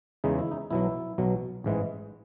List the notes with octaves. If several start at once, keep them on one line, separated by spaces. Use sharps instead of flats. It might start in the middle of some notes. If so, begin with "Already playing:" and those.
E2 C#3 E3 G#3 D#4
E4
D#4
B1 B2 F#3 E4
B1 B2 F#3
A1 G#2 E3 G#3